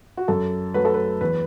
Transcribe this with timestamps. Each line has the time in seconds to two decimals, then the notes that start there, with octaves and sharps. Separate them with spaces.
0.17 F#4
0.28 F#2 A4
0.74 F#3 A3 B4
0.85 A4
0.94 B4
1.21 E2 B4